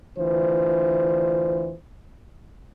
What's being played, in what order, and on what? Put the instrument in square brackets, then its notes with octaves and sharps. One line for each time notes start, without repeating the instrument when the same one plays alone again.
[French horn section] D2 E3 D4 F4 C5